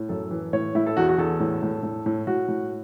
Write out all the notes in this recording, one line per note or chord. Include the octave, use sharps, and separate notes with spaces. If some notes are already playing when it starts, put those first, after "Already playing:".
Already playing: A2
F#2 A4
E3
A2 C#5
A2 E4
A4
E2 F#4
F#4
E2 A4
A2
A2
A2
A2
A2 F#4
A2